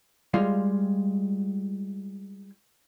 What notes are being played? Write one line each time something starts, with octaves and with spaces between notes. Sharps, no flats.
G3 G#3 F4 F5